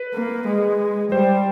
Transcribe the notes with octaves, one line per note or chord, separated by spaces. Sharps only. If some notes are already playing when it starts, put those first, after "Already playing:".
Already playing: B4
A#3
G#3
G3 C5